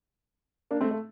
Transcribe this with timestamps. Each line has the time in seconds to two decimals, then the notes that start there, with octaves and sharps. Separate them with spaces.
0.71 A#3 D4
0.81 A3 C4
0.91 A3